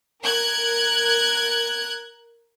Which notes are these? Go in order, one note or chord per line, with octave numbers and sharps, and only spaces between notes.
A#4 F#6 G#6